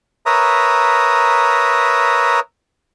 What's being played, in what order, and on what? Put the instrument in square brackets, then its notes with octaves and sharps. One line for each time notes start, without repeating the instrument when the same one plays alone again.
[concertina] A#4 B4 C#5 E5 A#5 D#6